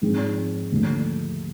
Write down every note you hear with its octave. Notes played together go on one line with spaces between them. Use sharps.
G#2 F3 G#3 C4
D#2 D3 F3 A3